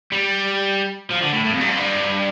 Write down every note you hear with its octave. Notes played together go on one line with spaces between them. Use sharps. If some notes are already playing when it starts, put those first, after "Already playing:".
G3
F3
D3
A2
A2
F2
G2
F2
G2